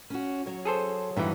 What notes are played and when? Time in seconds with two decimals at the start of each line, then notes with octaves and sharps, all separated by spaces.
0.10 C#4 F#4
0.46 F#3 C#5
0.65 G#4 A4 C5
1.17 G2 E3 F#3 B3 D#4